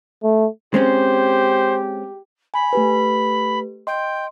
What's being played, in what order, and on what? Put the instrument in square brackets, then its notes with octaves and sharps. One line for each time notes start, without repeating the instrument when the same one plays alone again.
[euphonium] A3
[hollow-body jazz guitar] G#3 C4 C#4 [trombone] G4 [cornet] C5
[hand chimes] G#5 [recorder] B5
[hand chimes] A3 G4 B4
[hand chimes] D#5 C6 [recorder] G5